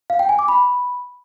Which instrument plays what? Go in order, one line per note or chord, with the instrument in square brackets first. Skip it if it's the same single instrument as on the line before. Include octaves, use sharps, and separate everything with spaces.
[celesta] F5
G5
G#5
D6
B5